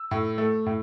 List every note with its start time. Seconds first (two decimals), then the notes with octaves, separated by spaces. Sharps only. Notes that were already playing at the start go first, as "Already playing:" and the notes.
Already playing: E6
0.11 A2
0.38 A3
0.66 A2